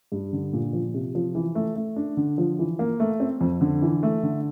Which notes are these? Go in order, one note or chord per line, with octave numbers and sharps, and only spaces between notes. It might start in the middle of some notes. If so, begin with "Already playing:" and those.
G2
D3
A#2
F3
C3
F3
E3
A3
A3
D4
D3
F3
E3
A#3
A3
C4
F2
D3
E3
A3
D3